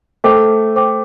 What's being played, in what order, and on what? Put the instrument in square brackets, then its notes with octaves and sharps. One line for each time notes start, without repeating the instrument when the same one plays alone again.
[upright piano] A3 [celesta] C5 G5 D6
[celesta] C5 G5 D6